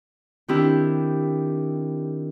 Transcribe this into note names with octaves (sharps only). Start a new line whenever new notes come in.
D#3 C4 D4 E4 G4